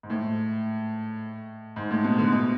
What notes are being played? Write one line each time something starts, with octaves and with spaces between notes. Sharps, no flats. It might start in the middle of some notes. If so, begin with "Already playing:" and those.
G#2
A2
G#2
A2
B2
D3
B2